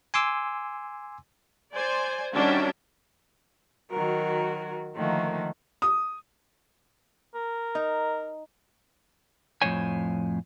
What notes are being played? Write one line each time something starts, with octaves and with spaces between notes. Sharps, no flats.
G#5 C6 D6 E6
C5 D5 G#5
D#3 G3 C#4 D4 F#4 E5
D#3 F#3 F#4 A#4
D3 D#3 F3 A3 A#3 F#4
D#6
A#4
D#4
F2 A2 A#3 C5 C#5 G#5